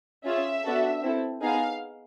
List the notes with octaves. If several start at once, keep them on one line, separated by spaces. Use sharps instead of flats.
C#4 F4 G#4 E5
B3 D4 F#4 A4
C4 E4 A4
B3 D#4 G#4 F5